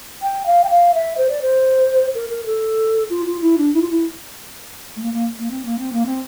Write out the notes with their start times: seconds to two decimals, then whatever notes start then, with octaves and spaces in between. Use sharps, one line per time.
0.22 G5
0.46 F5
0.64 G5
0.70 F5
0.94 E5
1.17 C5
1.29 D5
1.41 C5
2.14 A#4
2.30 A#4
2.46 A4
3.10 F4
3.26 F4
3.41 E4
3.58 D4
3.74 E4
3.82 F4
3.90 E4
4.96 A3
5.02 A#3
5.13 A#3
5.38 A#3
5.51 C4
5.65 A#3
5.79 C4
5.93 A#3
6.06 C4